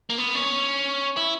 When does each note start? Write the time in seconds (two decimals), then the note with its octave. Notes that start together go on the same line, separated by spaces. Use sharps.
0.10 A#3
0.18 B3
0.35 C#4
1.17 E4